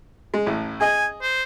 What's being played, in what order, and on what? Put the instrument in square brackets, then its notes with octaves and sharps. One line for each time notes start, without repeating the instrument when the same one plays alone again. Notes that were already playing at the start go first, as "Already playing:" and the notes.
[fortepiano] G#3
A1 A2
[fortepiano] G#4 D#5 [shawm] G#5
[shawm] C5